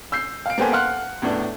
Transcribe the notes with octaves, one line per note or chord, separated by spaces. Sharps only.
E6 G6 C7
F5 D7
A#3 B3 G4 A4 C5 G#5
F5 F#5 C6 F6 F#6
E2 A2 E3 D4